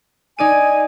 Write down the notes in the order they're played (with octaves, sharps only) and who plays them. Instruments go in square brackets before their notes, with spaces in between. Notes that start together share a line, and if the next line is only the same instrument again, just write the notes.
[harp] D#4 D5 D#7 [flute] G#5